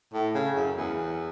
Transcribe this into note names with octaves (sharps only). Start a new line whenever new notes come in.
A2
C#3
F#2
E2